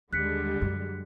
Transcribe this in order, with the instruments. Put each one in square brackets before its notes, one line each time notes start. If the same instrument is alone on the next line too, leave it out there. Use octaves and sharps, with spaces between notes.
[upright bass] D#2 [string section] D3 G3 G#3 [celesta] F#6 B6 C#7
[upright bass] F#2